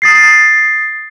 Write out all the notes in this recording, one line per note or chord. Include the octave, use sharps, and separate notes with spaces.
D#6 A6 C7